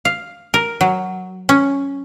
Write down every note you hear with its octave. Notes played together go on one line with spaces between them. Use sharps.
F5
A#4
F#3
C#4